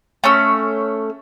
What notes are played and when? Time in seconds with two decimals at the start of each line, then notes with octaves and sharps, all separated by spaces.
0.24 A3 C#4 E6